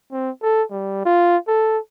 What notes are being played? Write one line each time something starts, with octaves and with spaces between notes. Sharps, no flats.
C4
A4
G3
F4
A4